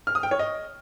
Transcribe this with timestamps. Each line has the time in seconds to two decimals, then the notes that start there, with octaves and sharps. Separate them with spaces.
0.07 F6
0.15 D#6
0.23 G5
0.31 C#5
0.39 D#5